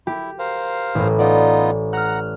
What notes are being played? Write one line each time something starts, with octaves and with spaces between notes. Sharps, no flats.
E4 G4
A#4 C5 F5
A1 A2
B3 D#4 F4 D5
F#5 A#5 F6 F#6